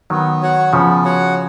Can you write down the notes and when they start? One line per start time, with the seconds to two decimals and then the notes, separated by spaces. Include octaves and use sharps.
0.10 D#3 F#3 B3
0.42 F#4 C#5 F#5
0.73 C#3 F3 B3
1.04 F#4 C#5 F#5